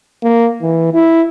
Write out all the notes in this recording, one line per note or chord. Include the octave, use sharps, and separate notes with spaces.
A#3
E3
E4